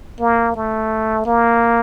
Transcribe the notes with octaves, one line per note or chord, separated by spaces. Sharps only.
A#3
A3
A#3